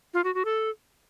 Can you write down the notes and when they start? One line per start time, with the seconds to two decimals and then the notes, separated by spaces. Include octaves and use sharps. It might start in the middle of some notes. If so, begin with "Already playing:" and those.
0.14 F4
0.24 F#4
0.35 F#4
0.45 A4